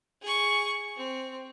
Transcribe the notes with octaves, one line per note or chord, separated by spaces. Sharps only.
G#4 C#6
C4